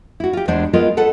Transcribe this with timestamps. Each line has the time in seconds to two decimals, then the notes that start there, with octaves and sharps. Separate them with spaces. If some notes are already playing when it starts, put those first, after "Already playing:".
0.20 E4 F#4
0.33 F4 G4
0.48 E2 G#3 D4 C5 F#5
0.73 G#3 B3 F4 A#4 D#5
0.97 A4 B4 F#5 A5